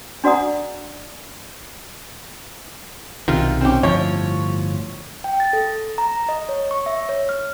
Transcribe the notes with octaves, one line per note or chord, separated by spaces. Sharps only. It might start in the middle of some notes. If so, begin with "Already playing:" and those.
D4 F#4 D5 F#5 A#5 D#6
B1 C3 D#3 F4
C4 C#4 G4
G1 A2 F3 C#5
G5
A6
A4
A#5
D#5
C#5
C#6
E5
C#5
F6